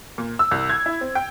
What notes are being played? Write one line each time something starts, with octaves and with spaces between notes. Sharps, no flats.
A#2
E6
C2
G#6
E4
C4
G5